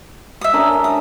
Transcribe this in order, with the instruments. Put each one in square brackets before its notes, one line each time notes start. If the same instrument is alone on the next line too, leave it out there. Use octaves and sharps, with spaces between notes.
[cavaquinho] E5 D#6
[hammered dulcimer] C#4 D4 A#4
E5
[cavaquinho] D#6